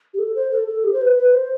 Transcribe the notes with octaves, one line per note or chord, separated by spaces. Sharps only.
G4
A4
C5
A4
A4
G4
C5
B4
B4
C5